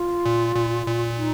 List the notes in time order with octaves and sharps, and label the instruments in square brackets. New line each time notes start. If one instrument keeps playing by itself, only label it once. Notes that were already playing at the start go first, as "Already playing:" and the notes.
Already playing: [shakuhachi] F4
[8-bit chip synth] A#2
A#2
A#2
[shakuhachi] D#4